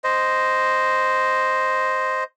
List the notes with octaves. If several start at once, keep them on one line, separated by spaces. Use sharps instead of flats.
C5 D#5